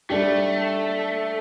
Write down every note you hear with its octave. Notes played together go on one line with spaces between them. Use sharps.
G3 A3 D4 G4